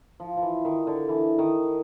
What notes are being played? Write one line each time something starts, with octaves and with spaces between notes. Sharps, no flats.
F3
F3
E3
D#3
D3
E3
D#3